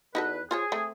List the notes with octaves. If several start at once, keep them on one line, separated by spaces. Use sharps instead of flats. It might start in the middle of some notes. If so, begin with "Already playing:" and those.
E2 D#4 F#4 A4 B4
F4 G#4 C5 C#5
A3 C4